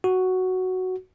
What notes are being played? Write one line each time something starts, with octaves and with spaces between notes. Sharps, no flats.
F#4